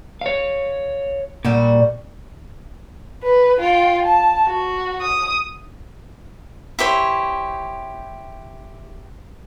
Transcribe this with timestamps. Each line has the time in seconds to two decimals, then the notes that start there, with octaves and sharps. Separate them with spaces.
0.21 C#5 F5
1.45 A#2 G3 F#4
3.23 B4
3.60 F4 G5
4.05 A5
4.46 F#4
5.01 D#6
6.79 E4 G4 C5 C#5